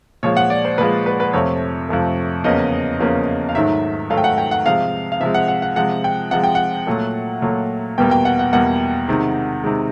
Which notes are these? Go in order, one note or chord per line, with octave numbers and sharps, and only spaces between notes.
A#2 F3 G#3 C#5
F#5
D5
C5
A#2 F3 G#3 B4
B4
B4
F2 C3 F3 A3 C#5
F2 C3 F3 A3
E2 C#3 F3 A#3 D#5
E2 C#3 F3 A#3
F5
G#2 D#3 F#3 A3 E5
G#2 D#3 F#3 A3 F5
G5
F#5
G5
F#5
C3 F3 G#3 F5
F5
C3 F3 G#3 E5
F#5
F#5
F#5
C3 F3 G#3 F#5
G5
C3 F3 G#3 F#5
G5
F#5
A#2 F#3 A3
A#2 F#3 A3
E2 B2 G3 A#3 G5
G5
F#5
F#5
E2 B2 G3 A#3 F#5
C3 D#3 G#3
C3 D#3 G#3